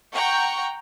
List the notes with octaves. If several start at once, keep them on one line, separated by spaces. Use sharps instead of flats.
F#5 G5 A#5 C#6